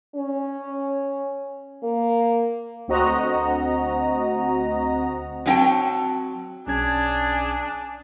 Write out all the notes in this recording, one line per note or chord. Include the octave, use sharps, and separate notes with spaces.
C#4
A#3
D2 C4 F#4 D#5 A#5
F#3 C4 G5 A5
B1 C#4 D4 G#4 G#6